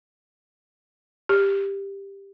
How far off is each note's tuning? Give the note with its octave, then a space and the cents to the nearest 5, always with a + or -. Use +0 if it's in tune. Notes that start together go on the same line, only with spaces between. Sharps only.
G4 +10